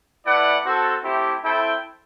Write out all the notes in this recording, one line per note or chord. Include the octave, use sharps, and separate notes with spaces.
A3 E4 B4 D5 F#5
C4 F#4 A4
A3 C4 E4 G4
C4 E4 A4 E5 G5